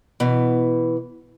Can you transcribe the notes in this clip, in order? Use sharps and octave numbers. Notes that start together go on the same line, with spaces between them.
B2 E3